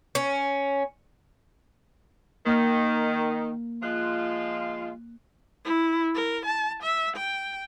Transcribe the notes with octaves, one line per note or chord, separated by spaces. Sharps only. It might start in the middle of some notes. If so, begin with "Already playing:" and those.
C#4
D#3 A#3
F3 G#3 F4 F#6
E4
A#4
A5
E5
G5